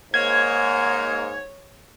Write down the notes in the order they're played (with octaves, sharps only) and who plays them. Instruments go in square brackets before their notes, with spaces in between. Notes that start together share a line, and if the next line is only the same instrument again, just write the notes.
[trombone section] G#2 [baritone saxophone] A#3 [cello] C#5 [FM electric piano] G#6